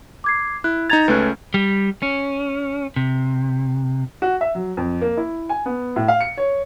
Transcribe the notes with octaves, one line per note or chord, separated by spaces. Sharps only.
D6 G#6 C7
E4 F#6
D#4 A#5 G#6 A6 F7
C#2 A3 C#4 B4 F#6
G3
C#4
C3
F#4
E5
F#3
F2
A#3
E4
G#5
B3
A2
F5
C#7
C#5